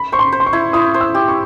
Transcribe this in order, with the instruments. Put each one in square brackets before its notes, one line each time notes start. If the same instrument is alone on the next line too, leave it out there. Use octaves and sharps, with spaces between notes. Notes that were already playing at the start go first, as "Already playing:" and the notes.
Already playing: [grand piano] B5
[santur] C5 [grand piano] C#6
[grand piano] C6
[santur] C5
[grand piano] C6
C#6
[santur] E4
[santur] E4 [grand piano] D#6
[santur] C5
[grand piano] E6
[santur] G4
[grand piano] C#6